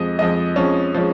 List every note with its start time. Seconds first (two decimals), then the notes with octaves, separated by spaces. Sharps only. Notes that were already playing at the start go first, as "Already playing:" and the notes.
Already playing: F2 F3 G#3 D#5
0.19 F2 F3 G#3 D#5
0.56 F2 F3 G#3 C#4
0.94 F3 G#3 C#4